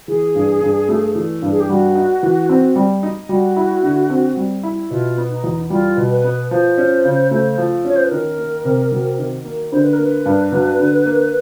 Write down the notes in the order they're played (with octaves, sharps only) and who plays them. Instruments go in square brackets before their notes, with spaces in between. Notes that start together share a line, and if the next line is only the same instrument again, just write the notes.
[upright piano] E3 [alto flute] G#4
[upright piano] G2
G2
A3
E3
G2
[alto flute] G#4
G4
[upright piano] G3 [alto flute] F#4
[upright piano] D#4
E3
C4
G3
D#4
[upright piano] G3 [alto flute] F#4
[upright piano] E4
D3
C4
G3
E4
[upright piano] B2 [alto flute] F4
[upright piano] B3
[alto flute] D#4
[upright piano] E2
[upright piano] G3 [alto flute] F4
[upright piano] B2
[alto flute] B4
[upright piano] B3
[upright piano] F3 [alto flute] C5
[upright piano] C#4
C#3
A3
F3
[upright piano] C#4 [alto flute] C#5
[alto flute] C5
B4
[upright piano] D#3 [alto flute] A#4
[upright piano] A#3
C3
F#3
D#3
A#3
[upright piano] D3 [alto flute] C5
[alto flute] B4
A#4
[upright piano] A#3 [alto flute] B4
[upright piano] G2
F#3
D3
A#3